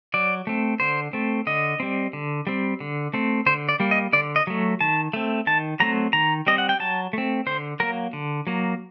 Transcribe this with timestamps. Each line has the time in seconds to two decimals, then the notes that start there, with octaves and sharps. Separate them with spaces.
0.14 F#3 D5
0.47 A3 C4
0.80 D3 C5
1.13 A3 C4
1.47 D3 D#5
1.80 G3 C4
2.13 D3
2.47 G3 C4
2.80 D3
3.14 A3 C4
3.46 D3 C5
3.69 D5
3.80 G3 A#3
3.91 D#5
4.13 D3 D5
4.36 D#5
4.47 F#3 A3
4.81 D#3 A5
5.13 A3 C4
5.47 D#3 A5
5.80 F#3 A3 C4 A#5
6.13 D#3 A#5
6.47 G3 C4 D#5
6.58 F#5
6.69 G5
6.80 F#3 A5
7.13 A3 C4
7.46 D3 C5
7.80 F#3 A#3 A#4
8.13 D3
8.47 F#3 A#3